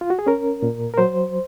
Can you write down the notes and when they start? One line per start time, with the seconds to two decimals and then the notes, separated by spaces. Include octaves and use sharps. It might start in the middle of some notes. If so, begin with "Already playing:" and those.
0.01 F4
0.10 F#4
0.19 G#4
0.27 C#4 A#4
0.63 A#2
0.94 A#4
0.98 F#3 C5